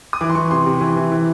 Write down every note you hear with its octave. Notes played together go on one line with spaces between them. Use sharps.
D#6
E3 D6
C6
E3 C#6
C3 C6
C3
E3
E3
E3